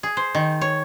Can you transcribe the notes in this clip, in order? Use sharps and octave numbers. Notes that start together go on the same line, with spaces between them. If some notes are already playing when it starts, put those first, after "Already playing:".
G#4
C5
D#3
C#5